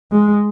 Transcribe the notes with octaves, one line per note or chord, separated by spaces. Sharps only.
G#3